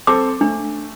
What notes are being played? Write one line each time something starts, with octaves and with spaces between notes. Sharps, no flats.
C4 A4 D6
A3 D4